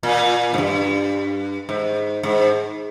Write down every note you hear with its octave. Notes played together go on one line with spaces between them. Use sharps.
A#2
G#2
G2
G#2
G#2